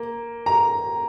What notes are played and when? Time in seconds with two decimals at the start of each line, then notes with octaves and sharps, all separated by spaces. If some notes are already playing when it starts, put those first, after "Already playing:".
Already playing: A#3
0.46 A#5